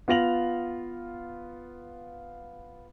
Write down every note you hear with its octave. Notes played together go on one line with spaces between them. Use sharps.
B3 F4 A#6 F7 F#7